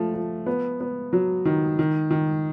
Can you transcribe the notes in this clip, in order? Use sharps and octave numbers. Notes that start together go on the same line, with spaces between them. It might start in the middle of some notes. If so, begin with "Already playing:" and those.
Already playing: F3 A3
F3
B3
B3
F#3
D#3
D#3
D#3